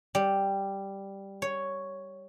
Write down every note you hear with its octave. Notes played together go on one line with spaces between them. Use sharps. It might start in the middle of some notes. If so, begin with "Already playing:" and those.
G3
C#5